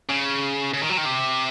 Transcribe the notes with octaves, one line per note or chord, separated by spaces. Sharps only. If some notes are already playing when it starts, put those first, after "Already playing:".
C#3
C#3
D#3
F#3
D#3
C3